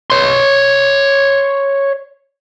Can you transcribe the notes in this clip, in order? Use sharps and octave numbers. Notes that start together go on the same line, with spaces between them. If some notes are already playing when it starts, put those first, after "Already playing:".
C#5 C6